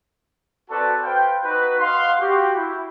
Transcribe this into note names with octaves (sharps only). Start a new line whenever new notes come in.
C4 F#4 A4 B4 D5 A5
B4 C5 F5 G5
D#4 F#4 B4
D#5 F5 F#5 C6
F#4 G4
E4